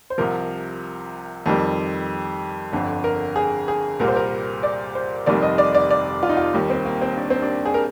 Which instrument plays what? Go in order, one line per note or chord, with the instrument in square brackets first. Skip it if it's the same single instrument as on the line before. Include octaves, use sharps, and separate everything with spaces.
[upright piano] C5
C2 C3 F3 A#4
F2 D#3 G3
G1 F2 D3
A#4
G#4
G#4
C2 A#2 G3 A#4
C5
A#4
D5
C5
F1 F2 D#3 G3 D5
D#5
D5
D5
D5
F4
D#4
F4
D#2 D#3 G3
C4
A#3
C4
D4
C4
D4
G#4
A#4